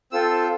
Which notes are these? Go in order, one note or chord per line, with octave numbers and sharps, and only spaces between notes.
C4 F4 A4 E6